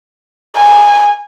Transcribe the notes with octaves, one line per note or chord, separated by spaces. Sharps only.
G#5